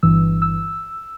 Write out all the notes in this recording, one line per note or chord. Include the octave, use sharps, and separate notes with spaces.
G1 G2 E3 E6
E6